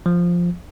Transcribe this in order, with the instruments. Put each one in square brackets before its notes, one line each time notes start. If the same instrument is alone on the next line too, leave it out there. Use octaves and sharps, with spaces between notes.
[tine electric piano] F3